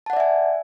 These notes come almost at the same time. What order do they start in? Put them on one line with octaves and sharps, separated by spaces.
A5 F#5 D5 E5 G#5